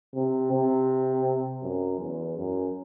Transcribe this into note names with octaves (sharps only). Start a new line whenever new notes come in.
C3
C3
F#2
E2
F#2